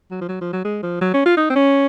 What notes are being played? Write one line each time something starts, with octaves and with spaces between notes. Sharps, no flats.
F#3
F3
F#3
F3
F#3
G#3
F3
F#3
C#4
F4
D#4
C4
C#4